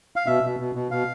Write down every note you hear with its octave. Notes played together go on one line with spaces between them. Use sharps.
F5
B2 E5
B2
B2
B2
B2 F5